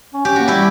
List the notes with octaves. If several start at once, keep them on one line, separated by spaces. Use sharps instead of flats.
C#4
C#4 G4
A#3 F#4
G3 E4 G4